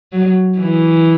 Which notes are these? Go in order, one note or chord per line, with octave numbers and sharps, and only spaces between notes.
F#3
E3